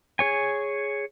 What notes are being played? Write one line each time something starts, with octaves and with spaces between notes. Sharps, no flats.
G#4 C#5 G#5